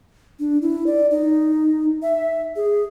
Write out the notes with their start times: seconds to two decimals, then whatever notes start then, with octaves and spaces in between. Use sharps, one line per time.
0.40 D4
0.62 E4
0.87 D5
1.11 D#4
2.02 E5
2.56 G#4